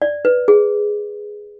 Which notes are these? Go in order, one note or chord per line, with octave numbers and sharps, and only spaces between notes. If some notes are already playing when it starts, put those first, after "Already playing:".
D5
B4
G#4